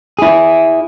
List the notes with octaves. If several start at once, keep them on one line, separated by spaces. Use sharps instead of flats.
E4 G#4